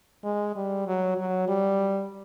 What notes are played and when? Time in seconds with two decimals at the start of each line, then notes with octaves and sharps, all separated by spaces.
0.24 G#3
0.56 G3
0.87 F#3
1.17 F#3
1.48 G3